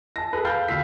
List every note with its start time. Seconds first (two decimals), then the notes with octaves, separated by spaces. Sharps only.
0.16 A5 A#6
0.33 G#4 A4 B4
0.45 F5 G5 B5 F6 G6 A6
0.68 D2 F5 E6 B6